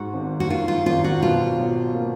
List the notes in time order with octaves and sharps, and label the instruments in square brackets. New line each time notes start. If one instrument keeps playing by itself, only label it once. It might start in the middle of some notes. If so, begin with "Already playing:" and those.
Already playing: [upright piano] G#2 [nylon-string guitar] F#4
[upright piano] G#1
[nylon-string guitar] F#4
[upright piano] D#3 [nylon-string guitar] F4
[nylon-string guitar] F4
[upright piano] G#1 [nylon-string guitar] F4
[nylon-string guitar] F#4
[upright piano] B2 [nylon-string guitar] F4
[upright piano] B1
A#3